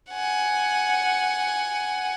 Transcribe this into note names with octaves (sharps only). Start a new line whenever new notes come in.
F#5 G#5